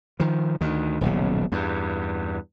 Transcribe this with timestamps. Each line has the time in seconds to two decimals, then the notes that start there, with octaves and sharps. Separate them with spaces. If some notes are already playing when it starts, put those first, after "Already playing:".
0.20 D#3 F3
0.61 D2 D#3
1.01 D#1 B1 C#3
1.52 E2 G2